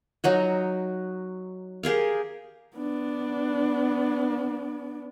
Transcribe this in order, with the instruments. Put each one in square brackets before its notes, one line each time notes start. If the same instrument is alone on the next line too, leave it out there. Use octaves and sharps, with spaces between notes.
[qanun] F#3 D#4 F#4
G4 G#4 A#4 F5
[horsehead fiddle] B3 D4